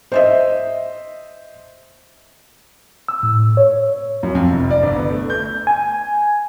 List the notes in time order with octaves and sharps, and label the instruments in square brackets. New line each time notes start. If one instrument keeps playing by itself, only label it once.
[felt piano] C5 D#5 E5
[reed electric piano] E6
A2
C#5
[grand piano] F#2
F2
F1
D5
G1
B3
A3
G6
[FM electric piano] G#5